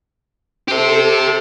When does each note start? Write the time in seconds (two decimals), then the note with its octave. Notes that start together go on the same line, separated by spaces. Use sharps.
0.68 G4 A4 C5